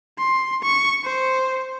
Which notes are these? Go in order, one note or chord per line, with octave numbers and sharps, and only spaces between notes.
C6
C#6
C5